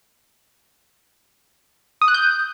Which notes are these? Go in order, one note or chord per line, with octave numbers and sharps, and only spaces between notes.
D#6
F#6
G6